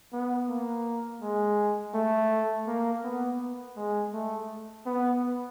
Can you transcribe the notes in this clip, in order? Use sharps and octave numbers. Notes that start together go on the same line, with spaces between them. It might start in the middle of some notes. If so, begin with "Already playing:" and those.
B3
A#3
G#3
A3
A#3
B3
G#3
A3
B3